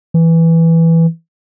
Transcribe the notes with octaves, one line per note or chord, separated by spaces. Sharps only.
E3